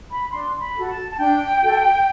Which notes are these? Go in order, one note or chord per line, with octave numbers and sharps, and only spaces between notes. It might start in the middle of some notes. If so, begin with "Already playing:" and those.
B5
D4 C6
B5
F#4 A4
A5
A5
D4 G5
F#4 A4